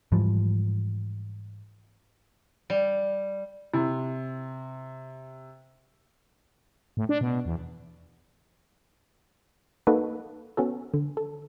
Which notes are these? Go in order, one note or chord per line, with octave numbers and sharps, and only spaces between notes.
G#2 E3 F3 G3
G3
C3 E4
A2
D4
B2
E2
A#3 D#4 F#4 A4 B4 D#5
B3 C#4 F#4 A4
D3
A4